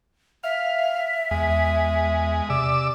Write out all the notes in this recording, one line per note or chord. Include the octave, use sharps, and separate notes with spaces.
E5 F5
E2 G#3
C3 D5 E6